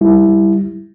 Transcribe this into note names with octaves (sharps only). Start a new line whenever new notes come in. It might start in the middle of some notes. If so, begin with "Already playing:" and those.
G3 E4
G3